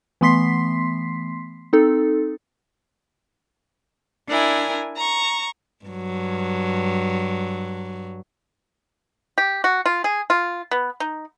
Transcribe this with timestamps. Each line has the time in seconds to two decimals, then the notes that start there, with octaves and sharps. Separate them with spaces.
0.21 E3 A3 B3 C6 B6 C7
1.73 C4 D#4 A4
4.27 D4 E4 A#4 G#5
4.95 A#5 C#6
5.85 G2 F#3
9.38 G4
9.64 F#4
9.86 F4
10.04 G#4
10.30 F4
10.71 B3
11.00 D#4